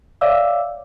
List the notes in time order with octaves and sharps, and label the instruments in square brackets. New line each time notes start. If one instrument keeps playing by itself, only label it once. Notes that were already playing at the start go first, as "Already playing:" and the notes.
[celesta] C#5 D5 E5 F5 D6 E6